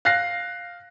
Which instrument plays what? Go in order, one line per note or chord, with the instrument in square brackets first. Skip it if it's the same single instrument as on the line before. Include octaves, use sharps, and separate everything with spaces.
[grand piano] F5 F#6 A#6 C7